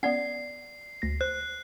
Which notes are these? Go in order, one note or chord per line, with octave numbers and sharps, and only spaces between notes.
B3 C#4 D5 F#5 C7
D2 A#6
C5 F#6